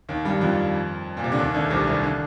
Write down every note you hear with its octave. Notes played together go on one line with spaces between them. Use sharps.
D#2 D#3
G2 G3
F2 F3
A#2
C3
D3
D#2 D#3
D2 D3
C2 C3
C2 C3
D3